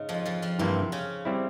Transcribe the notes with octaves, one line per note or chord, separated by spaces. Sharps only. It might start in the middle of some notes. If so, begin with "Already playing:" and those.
Already playing: G#2 C#3 G#3
F2 F3
F2 F3
F2 F3
G2 C3 E3 A#3 C4 E4
C#3 C#4
G3 C4 E4